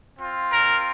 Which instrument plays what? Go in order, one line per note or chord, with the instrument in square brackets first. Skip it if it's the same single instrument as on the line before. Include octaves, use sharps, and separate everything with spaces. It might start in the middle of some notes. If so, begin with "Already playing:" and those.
[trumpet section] C4 F4
A#4